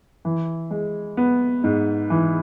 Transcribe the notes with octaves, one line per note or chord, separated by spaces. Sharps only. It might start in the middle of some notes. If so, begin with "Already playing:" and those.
E3
G#3
B3
G#2
E3